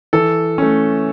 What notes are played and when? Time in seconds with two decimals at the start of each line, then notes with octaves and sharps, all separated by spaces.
0.13 E3 A4
0.58 A3 C#4